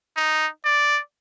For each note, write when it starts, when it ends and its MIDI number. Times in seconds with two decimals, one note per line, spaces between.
0.16 0.48 63
0.65 1.00 74